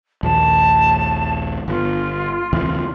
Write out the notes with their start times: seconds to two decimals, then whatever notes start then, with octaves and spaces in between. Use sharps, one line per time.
0.23 A#1 D#2 A5
1.68 G1 F4
2.53 D2 C3 E3